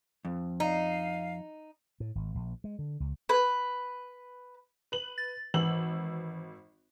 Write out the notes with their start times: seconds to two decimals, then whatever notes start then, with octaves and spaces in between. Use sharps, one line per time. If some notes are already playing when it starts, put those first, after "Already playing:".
0.25 F2
0.60 D#4 F5
2.00 A2
2.15 G#1
2.35 A#1
2.64 G#3
2.79 D3
3.00 C#2
3.29 B4
4.92 B4 F#7
5.18 A6
5.54 G#1 E3 E6 F#7